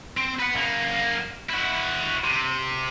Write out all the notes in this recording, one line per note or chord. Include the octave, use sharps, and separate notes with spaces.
C4
B4 F#5
F#2 A#3
E4 F#4
C3